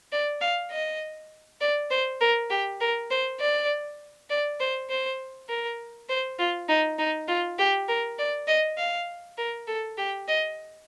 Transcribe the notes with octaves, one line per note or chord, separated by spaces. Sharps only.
D5
F5
D#5
D5
C5
A#4
G4
A#4
C5
D5
D5
C5
C5
A#4
C5
F4
D#4
D#4
F4
G4
A#4
D5
D#5
F5
A#4
A4
G4
D#5